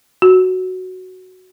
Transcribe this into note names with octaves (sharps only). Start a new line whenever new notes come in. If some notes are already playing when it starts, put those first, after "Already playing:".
F#4